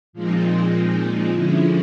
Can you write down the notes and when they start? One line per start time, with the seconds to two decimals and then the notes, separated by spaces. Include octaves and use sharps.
0.13 A#2 F3 G#3 C4 D#4
1.32 D3 F3 G#3 C#4 E4